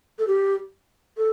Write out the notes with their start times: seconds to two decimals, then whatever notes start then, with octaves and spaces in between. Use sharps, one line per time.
0.19 A4
0.27 G4
1.17 A4